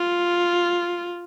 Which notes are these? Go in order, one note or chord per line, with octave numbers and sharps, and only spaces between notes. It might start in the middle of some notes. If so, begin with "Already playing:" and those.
Already playing: F4